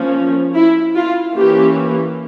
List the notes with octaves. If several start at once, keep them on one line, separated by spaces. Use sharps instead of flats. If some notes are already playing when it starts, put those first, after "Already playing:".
Already playing: F3 A#3 C#4
E4
F4
E3 A#3 C#4 G4